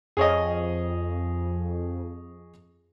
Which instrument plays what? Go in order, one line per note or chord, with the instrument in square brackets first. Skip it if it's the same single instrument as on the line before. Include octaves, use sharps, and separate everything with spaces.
[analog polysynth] F2 [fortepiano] G#4 C#5 D#5